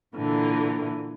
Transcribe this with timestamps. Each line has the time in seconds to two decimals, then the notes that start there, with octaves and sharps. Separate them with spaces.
0.16 A#2 D3 E3